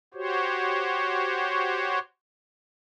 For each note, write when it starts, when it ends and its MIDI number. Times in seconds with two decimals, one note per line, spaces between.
0.14 1.99 66
0.14 1.99 67
0.14 1.99 72
0.14 1.99 73